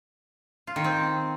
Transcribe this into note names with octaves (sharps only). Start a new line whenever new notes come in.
F4
D#3
C4